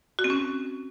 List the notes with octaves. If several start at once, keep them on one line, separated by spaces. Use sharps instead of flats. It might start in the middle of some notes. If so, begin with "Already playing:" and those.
F#4
C4
C#4